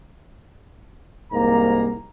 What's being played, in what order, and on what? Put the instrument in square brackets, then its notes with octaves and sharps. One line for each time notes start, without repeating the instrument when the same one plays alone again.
[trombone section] C2 G#2 A#3 [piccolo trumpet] A#5